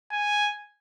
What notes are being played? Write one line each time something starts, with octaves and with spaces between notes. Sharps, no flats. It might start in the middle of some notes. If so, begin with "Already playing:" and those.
G#5